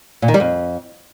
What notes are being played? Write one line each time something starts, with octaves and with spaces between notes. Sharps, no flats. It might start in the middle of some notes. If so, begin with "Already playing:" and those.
A#2
D#3
G3
F2